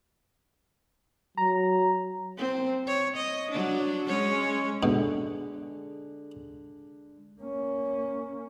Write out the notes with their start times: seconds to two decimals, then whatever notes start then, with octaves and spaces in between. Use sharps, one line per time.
1.38 F#3 A#5
2.37 C4
2.87 C#5
3.16 D#5
3.51 F#3 D4
4.08 G#3 C#4 C#5
4.83 B2 D3 G#3 G#4
7.42 A#3 C#4